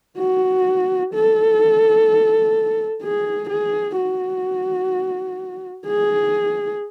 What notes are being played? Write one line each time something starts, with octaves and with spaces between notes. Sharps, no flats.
F#4
A4
G#4
G#4
F#4
G#4